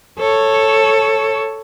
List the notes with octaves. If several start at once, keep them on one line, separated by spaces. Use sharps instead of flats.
A4 C#5